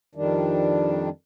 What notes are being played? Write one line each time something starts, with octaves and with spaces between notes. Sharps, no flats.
F2 D#3 G3 D4